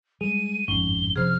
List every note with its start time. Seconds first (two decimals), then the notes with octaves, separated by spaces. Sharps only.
0.21 G3 G#3 G#4 D#7
0.68 G1 F2 G#2 C#4 G7
1.16 F#1 C3 F3 G#4 C5 F6